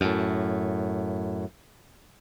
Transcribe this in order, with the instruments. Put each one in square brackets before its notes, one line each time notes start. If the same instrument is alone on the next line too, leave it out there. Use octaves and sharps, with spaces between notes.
[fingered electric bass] F#2 A2